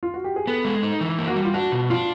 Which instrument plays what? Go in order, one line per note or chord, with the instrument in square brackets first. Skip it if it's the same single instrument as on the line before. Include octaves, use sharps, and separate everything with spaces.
[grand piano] F4
F#4
G4
G#4
[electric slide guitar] B3 [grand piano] A4
[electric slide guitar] G#3
D#4
E3
A#3
[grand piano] F#4
[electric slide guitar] G3
[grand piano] F4
[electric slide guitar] D4 [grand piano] F#4
[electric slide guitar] B2
[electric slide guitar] D4 [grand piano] F4